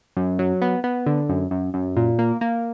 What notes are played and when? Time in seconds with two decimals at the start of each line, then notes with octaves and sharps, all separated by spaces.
0.17 F#2
0.39 F#3
0.62 B3
0.84 B3
1.06 D3
1.29 F#2
1.51 F#2
1.74 F#2
1.96 A#2
2.19 A#3
2.41 A#3